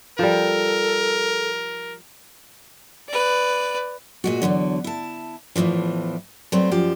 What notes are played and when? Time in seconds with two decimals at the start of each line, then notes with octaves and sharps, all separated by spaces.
0.19 F3 G3 A4 A#4
3.08 B4 D5
4.24 A#2 G#3 F#4
4.42 E2 G2 D3 F#3
4.84 E4 A5
5.56 E2 A2 C#3 E3 F3
6.52 F#3 G3 A3 B3 C4 C5
6.71 F#2 F3 G4